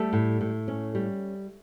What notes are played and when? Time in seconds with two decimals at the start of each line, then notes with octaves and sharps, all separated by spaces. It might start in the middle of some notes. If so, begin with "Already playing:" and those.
Already playing: G3 A3 A4
0.13 A2
0.41 A2
0.68 C#4
0.95 G3